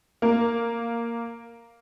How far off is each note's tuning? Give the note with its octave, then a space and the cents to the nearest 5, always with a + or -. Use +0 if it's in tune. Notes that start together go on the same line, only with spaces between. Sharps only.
A#3 -5